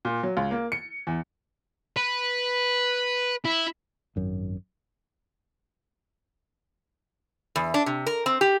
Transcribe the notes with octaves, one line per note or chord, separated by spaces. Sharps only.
A#2
F#3
C#2
A#3
C#7
E2
B4
E4
G#1 F#2
E2
D4
C3
A#4
C4
G4